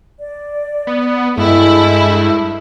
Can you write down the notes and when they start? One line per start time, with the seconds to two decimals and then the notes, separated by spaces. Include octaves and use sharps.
0.19 D5
0.87 B3
1.38 G2 G#3 E4 A4 A5 E6